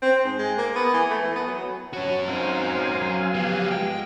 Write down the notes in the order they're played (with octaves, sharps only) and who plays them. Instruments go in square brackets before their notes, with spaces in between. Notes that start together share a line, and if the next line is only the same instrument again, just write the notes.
[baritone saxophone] C4
G#2
G#3
A#3
B3
E3
A3
E3
B3
F#3
[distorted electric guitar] C#4 F#4 [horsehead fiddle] C#5 A5
[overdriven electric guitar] C4 D#4 [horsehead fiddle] A#4 C5 [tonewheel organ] F5 G#5
[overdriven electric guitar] F#3
[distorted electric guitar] F3 B3 [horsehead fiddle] G4
[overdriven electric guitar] G#3 [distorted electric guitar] G5